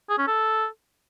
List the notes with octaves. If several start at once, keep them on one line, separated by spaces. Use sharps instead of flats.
G#4
C#4
A4